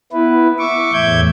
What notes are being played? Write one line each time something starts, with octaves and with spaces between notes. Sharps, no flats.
B3 E4 B4
E5 C#6 D6
E2 A2 E5 G6 G#6